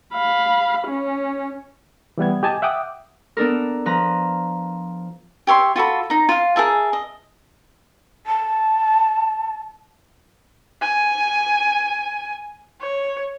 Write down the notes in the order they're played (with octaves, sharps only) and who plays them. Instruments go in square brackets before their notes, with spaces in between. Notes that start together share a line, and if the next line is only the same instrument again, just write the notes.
[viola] F5 B5
C#4
[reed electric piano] E3 G3 B3 G#6
G4 D#5 G#5 A5
E5 F#5 G5 D6 D#6
[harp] B3 D4 A4 A#4
F3 B4 A#5
[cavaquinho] G4 C#5 E5 C6
F4 F#4 A4 B5
D#4 A#5
F4 F5
G#4 A#4 E5 A5
D#5
[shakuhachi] A5
[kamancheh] G#5
C#5